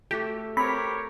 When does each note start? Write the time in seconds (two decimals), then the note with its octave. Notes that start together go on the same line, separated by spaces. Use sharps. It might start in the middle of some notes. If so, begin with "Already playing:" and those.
0.11 A3 F#4 G4 A4
0.57 C4 G4 A#4 C#5 B5